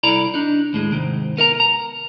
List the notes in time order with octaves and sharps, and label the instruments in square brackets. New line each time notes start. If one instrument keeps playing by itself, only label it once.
[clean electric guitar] C2 E4 A4 D5 A#5 B5
D4 D#4
D#2 A2 G#3
G#2 C3 D#3
B3 A#4 D#5 A#5
A#5